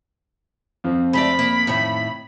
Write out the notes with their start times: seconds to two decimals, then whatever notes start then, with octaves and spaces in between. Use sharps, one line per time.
0.84 F2 F3 C4
1.13 G#3 A3 D5 B5
1.39 A#3
1.67 A2 D#3